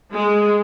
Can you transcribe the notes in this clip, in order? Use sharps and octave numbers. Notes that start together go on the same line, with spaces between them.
G#3